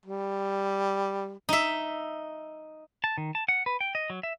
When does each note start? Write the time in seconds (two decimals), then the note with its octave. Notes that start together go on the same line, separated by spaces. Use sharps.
0.06 G3
1.49 D#4 E5
3.04 A5
3.18 D#3
3.35 A5
3.49 F#5
3.66 B4
3.81 G5
3.95 D#5
4.10 F#3
4.23 E5